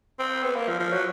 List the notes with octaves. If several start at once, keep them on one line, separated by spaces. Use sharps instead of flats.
C4
B3
A#3
F3
F3
F#3